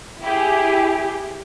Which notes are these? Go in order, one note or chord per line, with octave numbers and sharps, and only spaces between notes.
E4 G4 G#4